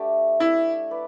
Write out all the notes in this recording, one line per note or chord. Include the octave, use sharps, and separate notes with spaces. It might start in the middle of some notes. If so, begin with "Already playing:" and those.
Already playing: A3 D4 G4 D5
E4
B4 D5